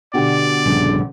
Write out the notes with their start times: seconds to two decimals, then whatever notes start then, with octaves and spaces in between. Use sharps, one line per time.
0.14 B2 D3 G4 D5
0.66 A#1 G2 C#3